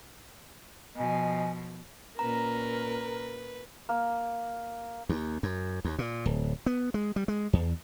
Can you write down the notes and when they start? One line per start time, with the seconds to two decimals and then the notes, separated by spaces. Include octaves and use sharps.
0.96 B2 F3 D#5 G#5
2.19 A#2 C#4 A#4 B4 A#5
3.89 A#3
5.09 D#2
5.43 F#2
5.85 D#2
5.99 A#2
6.26 D1
6.66 B3
6.94 G#3
7.16 G3
7.28 G#3
7.53 E2